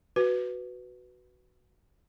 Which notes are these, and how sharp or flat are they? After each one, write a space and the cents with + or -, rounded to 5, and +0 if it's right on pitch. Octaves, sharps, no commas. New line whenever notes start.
F#4 +0 B4 +0